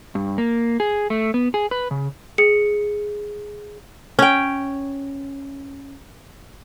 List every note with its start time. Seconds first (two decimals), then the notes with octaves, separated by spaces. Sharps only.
0.15 G2
0.38 A#3
0.80 G#4
1.10 A3
1.34 B3
1.54 G#4
1.71 B4
1.91 C#3
2.38 G#4 C#7
4.19 C#4 G5